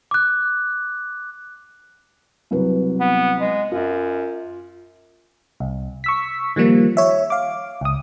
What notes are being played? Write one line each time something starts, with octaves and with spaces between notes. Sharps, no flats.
D6 F#6
C2 F#3 B4
B3
G#3
F#2 F4
C2
C#6 E6 B6
D#3 F3 G3 A#3
C#5 E5
F5 D6
C#2 D#6